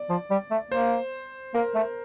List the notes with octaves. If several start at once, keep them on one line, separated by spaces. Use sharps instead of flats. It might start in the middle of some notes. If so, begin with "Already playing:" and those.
Already playing: D5
F3
G3
A3
A#3 C5
A#3 A#4
A3